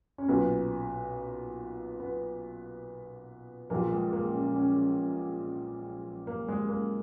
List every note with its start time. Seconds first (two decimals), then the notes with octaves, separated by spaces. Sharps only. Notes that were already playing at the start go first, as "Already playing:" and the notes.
0.18 C#4
0.28 B1 A#2 B3
2.00 B3
3.70 A#1 A#2 A#3
3.91 G#3
4.13 A#3
4.34 C#4
4.56 C#4
6.27 A#3
6.48 G#3
6.69 A#3